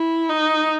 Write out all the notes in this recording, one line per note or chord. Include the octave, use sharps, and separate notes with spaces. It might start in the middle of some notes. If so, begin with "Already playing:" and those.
Already playing: E4
D#4